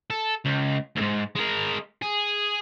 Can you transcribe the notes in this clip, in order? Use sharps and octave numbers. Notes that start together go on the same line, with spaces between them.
A4
C#2
D2 G#2
G#3 A#4
G#4